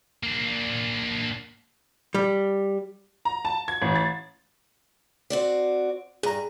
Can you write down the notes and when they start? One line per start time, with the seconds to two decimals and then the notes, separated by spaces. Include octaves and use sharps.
0.23 A#3 D4
2.15 G3
3.25 A#5
3.45 A5
3.68 G#6
3.82 A1
3.96 A6
5.30 C4 F#4 D5
6.23 G2 G#4 A#5